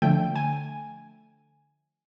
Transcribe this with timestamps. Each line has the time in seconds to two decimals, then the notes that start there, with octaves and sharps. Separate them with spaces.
0.02 D3 F3 A3 G5
0.36 G#5